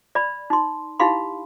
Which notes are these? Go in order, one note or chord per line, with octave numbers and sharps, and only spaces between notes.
D5 B5
D#4 C6
D#4 E4 G4 F5 B5 C6